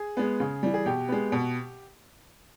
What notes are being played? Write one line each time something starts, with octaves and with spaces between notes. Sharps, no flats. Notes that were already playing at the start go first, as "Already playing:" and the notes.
Already playing: G#4
G#3 B3
C#3
E3 G3
G#4
B2 G4
G#3 B3
B2